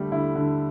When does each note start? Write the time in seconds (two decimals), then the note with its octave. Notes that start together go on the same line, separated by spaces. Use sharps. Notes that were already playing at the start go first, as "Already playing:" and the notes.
Already playing: D3 G3 A3
0.12 D3 E4
0.35 D3